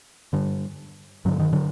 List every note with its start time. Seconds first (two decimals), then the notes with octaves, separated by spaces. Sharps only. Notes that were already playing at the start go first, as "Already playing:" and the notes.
0.33 G2 D3
1.25 G2 D3 F#3
1.39 D#3
1.53 D3 F#3